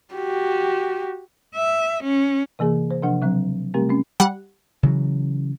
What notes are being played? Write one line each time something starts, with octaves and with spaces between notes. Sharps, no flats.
F#4 G4
E5
C#4
C3 E3 A#3 G#4
C5
C3 F3 D4 F#5
C#3 F#3 C4
C3 G3 A3 C4 G4 A#4
A3 C4 C#4
G3 F#5
C#3 E3 F#3